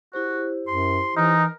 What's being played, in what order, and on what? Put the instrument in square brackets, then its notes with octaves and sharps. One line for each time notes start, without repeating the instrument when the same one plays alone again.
[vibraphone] E4 G4 C5 [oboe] F#4
[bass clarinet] F#2 [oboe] C6
[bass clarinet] E3 [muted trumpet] D#4 [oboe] A#4